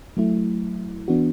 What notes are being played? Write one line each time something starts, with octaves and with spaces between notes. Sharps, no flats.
F#3 A3 E4
E3 B3 D4 F#4